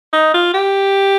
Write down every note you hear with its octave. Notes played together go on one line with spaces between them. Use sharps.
D#4
F4
G4